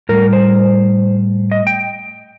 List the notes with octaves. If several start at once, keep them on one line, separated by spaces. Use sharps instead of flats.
A2 G3 A#4
C5
D#5
G5